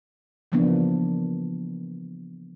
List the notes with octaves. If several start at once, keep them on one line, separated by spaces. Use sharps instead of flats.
C#3 E3 F3 A#3 B3 D4